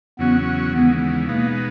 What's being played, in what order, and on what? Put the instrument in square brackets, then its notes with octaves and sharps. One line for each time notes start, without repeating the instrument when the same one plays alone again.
[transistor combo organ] E2 C#3 F#3 C#4 F#4 [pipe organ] B3
[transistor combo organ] D#2 C#3 E3 G#3 [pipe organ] B3
[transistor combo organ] B2 G#3 B3 D#4 [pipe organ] A#3